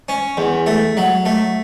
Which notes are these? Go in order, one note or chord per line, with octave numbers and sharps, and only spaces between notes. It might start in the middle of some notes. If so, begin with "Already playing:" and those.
C#4
E2
A3
F#3
A3